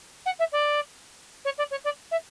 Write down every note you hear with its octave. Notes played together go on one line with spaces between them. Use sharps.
F#5
E5
D5
C#5
D5
C#5
D5
E5